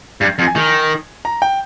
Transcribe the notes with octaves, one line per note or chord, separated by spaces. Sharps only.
G2
F2
G#5
D#3
A#5
G5